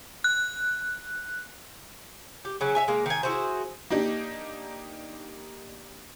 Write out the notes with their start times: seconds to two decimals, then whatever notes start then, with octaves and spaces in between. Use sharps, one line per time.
0.24 F#6
2.45 G4
2.61 C#3 F#3 C#4
2.75 C#5 E5 G#5
2.88 G#3 A#3
3.06 D#3 G#5
3.23 E4 F#4 G#4 C5
3.90 A#3 D4 D#4 G4